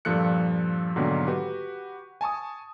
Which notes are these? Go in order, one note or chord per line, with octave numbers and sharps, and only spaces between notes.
G2 A#2 F3 A4 F#6 C#7
G#2 B2 D3 D#3 F#3 A#3
F#4 G4 B4
G#5 A5 C#6 D#6